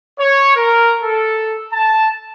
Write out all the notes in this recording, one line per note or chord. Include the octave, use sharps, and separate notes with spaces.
C#5
A#4
A4
A5